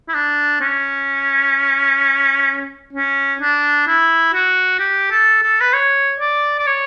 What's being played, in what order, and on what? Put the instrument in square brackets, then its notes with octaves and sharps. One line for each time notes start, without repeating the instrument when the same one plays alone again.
[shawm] E4
D4
C#4
C#4
D4
E4
F#4
G4
A4
A4
B4
C#5
D5
D5
C#5